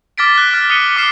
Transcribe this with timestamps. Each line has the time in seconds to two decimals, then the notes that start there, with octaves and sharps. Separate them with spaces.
0.18 D6 F6 A6 B6 D7
0.38 F#6
0.54 F6 A6
0.70 D#6 B6 C#7 D#7 G7
0.96 D6 F6 C7 E7